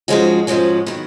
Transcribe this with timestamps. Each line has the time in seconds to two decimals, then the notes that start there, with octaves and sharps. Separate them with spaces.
0.08 G#2 F3 G#3 C#4 F#4
0.47 G#2 F3 G#3 C#4 F#4
0.86 D#3 F#3 B3